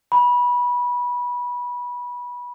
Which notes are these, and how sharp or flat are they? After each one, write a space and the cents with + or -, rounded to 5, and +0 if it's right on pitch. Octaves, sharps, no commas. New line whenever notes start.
B5 -20